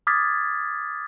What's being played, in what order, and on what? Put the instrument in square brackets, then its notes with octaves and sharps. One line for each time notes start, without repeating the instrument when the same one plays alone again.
[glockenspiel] D6 D#6 F6 G#6 A6 B6